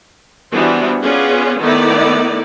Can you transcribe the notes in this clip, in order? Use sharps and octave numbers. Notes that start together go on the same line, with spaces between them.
E3 G3 B3 D4 F#4 C5
B3 C#4 F4 G#4 D5
D#3 A3 B3 D#4 E4 D5